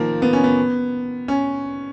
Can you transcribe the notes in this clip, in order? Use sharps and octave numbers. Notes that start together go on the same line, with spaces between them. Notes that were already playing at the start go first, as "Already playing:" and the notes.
Already playing: D#3 F3 A#3
B3
C#4
B3
C#4